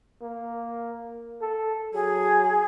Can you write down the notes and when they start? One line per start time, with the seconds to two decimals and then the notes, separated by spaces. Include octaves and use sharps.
0.22 A#3
1.42 A4
1.94 F#3 G#4